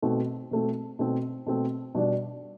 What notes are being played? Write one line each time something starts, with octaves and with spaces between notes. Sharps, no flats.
B2 A3 C4
B2 A3 C4
B2 A3 C4
B2 A3 C4
B2 G3 D4